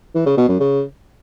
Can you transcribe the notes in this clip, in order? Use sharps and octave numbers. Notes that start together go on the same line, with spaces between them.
E3
C#3
B2
F#2
C#3